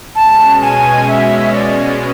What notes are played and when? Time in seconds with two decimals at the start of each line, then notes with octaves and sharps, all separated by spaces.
0.15 B2 G#3 C#4 A5
0.62 G#5
1.08 E5
1.54 D5